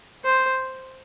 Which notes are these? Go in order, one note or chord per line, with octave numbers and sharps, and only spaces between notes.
C5